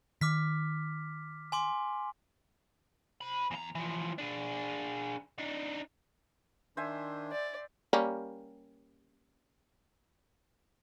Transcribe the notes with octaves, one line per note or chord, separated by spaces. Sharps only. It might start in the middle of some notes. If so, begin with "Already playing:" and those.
D#3 D6 F6 B6
G#5 C6 D6
C5 B5
E2 A#5
E3 F3
D4 G#4
D4 D#4
D#3 D4 C5 E5 G#5
D5
G3 A#3 C#4